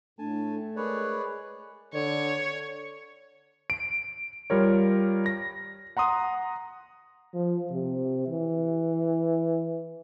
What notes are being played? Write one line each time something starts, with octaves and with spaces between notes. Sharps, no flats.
A2 A3 D4 G#5 A5
G#3 G#4 A#4 B4 C#5 D5
D3 C#5
D7
G3 F4 A#4 C#5
A#6
F#5 A#5 C6 D#6
F3
C3
E3